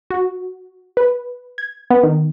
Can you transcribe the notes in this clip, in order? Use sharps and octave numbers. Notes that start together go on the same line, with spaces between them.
F#4
B4
G#6
B3
D#3